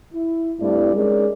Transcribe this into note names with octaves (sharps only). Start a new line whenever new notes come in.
E4
G2 A3 C4 E4 G4 D5
G#3 C#4 D#4 G#4 A#4 D5